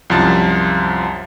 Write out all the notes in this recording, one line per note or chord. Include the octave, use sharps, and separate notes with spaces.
C2 F#2 F3 A5 A6